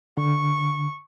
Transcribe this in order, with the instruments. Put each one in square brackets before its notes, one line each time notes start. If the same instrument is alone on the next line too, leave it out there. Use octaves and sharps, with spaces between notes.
[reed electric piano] D3 [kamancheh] C#6